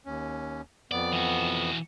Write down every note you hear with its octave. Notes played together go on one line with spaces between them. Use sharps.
D#2 C#4
F2 B3 D5
E3 F#4